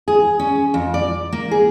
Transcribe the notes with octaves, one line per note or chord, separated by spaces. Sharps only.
G#4
C#4
F2
D5
A#3
G#4